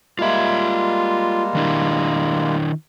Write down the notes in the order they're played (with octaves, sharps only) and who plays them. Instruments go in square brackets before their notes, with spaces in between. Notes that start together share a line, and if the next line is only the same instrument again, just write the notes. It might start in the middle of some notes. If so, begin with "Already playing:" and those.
[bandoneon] G3 G#3 A#3 [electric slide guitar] F4 E5
[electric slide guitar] D#3 D4 E4